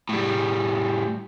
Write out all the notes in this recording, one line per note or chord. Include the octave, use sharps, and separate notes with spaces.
A2 G3